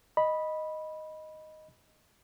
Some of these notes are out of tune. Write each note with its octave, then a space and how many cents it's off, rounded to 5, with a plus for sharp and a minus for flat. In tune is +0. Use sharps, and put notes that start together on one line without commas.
D#5 +0 B5 -10